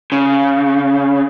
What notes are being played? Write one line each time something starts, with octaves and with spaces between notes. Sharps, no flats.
C#3